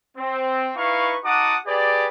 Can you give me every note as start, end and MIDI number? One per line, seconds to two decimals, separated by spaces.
0.18 0.70 60
0.76 1.16 63
0.76 1.16 64
0.76 1.16 71
0.76 1.16 77
0.76 1.16 85
1.24 1.56 63
1.24 1.56 66
1.24 1.56 78
1.24 1.56 81
1.24 1.56 86
1.24 1.56 87
1.66 2.07 67
1.66 2.07 68
1.66 2.07 71
1.66 2.07 74